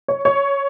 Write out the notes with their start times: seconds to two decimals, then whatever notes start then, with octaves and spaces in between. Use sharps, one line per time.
0.08 C#5
0.25 C#5